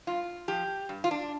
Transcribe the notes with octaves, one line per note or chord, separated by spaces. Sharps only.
G2 F4
F3 G4
G2
F4
D4